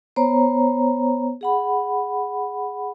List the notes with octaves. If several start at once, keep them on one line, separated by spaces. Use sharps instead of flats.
B3 C5 C#5 A#5
G#4 F#5 B5